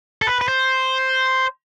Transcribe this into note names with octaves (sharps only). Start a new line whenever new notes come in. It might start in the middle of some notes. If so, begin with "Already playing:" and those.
A4
B4
B4
C5